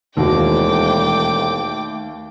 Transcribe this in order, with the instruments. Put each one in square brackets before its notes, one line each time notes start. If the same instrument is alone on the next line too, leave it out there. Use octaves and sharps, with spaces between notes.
[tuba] E1 [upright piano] D#2 F#4 [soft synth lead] A3 [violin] G5 D6